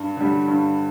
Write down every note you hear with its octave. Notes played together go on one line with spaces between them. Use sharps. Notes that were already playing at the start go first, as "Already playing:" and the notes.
Already playing: G2
D3 G3
G2